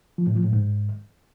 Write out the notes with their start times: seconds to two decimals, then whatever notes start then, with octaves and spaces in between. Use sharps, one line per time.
0.18 F3
0.27 A2
0.36 F3
0.44 A2
0.53 G#2